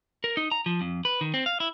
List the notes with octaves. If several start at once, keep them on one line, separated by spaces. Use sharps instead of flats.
A#4
D#4
A#5
F3
F2
B4
D#3
C4
F5
E4